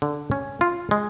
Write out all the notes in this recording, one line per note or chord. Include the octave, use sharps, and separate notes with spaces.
D3
C#4
F4
G#3